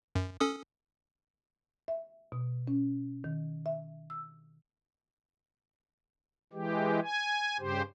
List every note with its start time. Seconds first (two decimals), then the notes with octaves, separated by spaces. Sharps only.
0.15 F#2
0.40 C#4 A4 D#6
1.88 E5
2.32 B2
2.67 C#4
3.24 D#3
3.66 E5
4.10 E6
6.53 E3 G#3 G4
7.03 G#5
7.59 G2 C#3 G4 C5